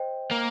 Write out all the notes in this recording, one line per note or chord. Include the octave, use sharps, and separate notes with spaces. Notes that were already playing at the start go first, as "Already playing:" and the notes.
Already playing: C5 D#5 G5
A#3